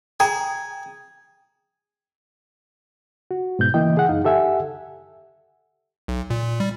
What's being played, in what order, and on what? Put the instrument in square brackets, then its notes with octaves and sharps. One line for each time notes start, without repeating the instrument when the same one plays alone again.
[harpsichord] G#4 [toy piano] G5 A#5
[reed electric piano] F#4
G#2 B2 G6
C#3 E3 A#3 E4 D#5 G5
G#4 F#5
F#2 D#4 F5
G4 A4 E5 F#5 G#5
[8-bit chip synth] B1
A#2
G3